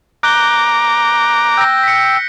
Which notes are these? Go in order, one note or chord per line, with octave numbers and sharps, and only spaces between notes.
A#5 D6 F#6 G6 G7
G5 E6 G6 A#6
B6 C#7